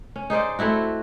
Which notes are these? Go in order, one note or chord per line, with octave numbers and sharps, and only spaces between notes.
C#4
D#4 G#4 C5 D5
A3 C4 E4 F#4